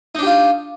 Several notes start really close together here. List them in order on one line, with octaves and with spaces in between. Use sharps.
D#4 D4 G4 F4